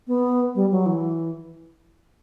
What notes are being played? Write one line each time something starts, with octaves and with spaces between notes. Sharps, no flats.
B3
G3
F#3
E3